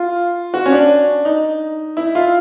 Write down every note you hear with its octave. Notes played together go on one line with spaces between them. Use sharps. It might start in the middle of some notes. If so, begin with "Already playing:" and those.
Already playing: F4
F#4
C#4
D4
D#4
E4
F4